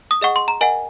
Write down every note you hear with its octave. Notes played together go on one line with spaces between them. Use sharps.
D#6
G#4 D#5 F#5 C#6
C6
A#5
A#4 D#5 F#5 G#5